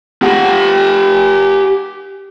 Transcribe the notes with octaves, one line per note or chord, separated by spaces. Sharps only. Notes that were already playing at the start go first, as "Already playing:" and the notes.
G4 F#5